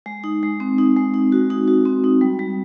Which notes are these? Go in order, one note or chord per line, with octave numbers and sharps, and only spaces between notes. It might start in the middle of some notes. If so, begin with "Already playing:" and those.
G#3
D#4
G#3
C4
D#4
G#3
D#4
F#4
D#4
F#4
C4
D#4
G3
G3